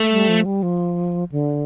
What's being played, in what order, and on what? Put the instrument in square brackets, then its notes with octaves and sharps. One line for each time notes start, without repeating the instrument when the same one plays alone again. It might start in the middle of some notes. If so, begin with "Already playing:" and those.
Already playing: [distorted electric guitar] A3
[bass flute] G3
F3
G3
F3
D3